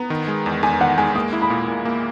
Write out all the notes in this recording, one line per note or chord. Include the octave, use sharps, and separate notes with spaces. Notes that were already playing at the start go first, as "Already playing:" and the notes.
Already playing: B3 A#5
D#3
G#3
E2
E2 G#5
D#3 F#5
G#3 G#5
A#3 D#6
E4
B5
A#2
A#2
A#3